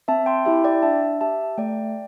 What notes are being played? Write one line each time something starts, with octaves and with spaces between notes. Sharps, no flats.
C4 E5 A5
G5 C6
E4 G4 E5 A5
D5 G5
D4 E5 A5
G4 E5 A5
A3 D5 G5